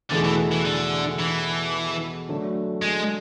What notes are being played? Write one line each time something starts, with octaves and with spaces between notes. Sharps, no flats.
E2 B2 D3 A3 E4 G#4
E3
E3
D3
E3
D3 F#3 A3 D4
G#3